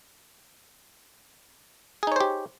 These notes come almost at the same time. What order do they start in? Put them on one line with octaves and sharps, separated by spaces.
G#4 D#4 C#5 C5 G4